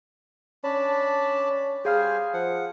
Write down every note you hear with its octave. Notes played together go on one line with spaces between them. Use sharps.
C#4 D4 A5 B5
G3 G#4 C5 F5 G#5 F6
F3 F#5